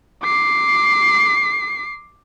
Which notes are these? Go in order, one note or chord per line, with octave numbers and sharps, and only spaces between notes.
D6 C7